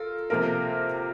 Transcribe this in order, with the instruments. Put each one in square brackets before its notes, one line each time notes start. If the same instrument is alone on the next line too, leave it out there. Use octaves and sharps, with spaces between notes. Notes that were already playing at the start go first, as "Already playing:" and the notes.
Already playing: [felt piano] F4 A#4 [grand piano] A4
[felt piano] C3 F3 A#3 F4 A#4